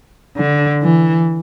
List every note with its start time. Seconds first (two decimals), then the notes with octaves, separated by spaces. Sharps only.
0.37 D3
0.82 E3